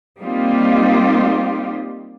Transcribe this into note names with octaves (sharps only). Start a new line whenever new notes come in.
G3 A#3 C4 D#4 F4 G4